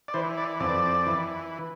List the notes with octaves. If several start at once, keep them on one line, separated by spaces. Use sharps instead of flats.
D5
E3 C5
D5
F2 D5
E3